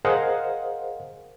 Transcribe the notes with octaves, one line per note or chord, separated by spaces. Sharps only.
G#4 A#4 C5 D#5 F5 F#5